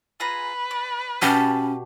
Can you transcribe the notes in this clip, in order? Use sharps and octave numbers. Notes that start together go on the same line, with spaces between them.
F4 G#4 B4 A#5
D5
B2 C#4 G4 A5